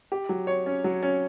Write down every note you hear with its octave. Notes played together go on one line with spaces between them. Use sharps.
G4
F#3
C#5
C#4
F#3
C#4